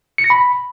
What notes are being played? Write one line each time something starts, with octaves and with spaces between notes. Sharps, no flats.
C#7
A#6
B5